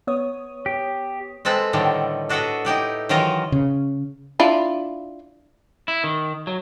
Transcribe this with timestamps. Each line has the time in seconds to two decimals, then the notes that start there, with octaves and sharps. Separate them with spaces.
0.07 B3 C#5 D#6
0.66 G4
1.45 G#3 C4 A4 B4
1.73 A2 D3 D#3 G3
2.29 D4 F#4 A4 B4 D#5 E5
2.65 D#4 E4 G4 B4
3.09 D#3 E3 F#3 F4 A#4 D#5
3.52 C#3
4.40 D4 E4 F4
5.88 E4
6.04 D#3
6.47 F#3